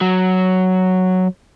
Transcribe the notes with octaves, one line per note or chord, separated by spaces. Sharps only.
F#3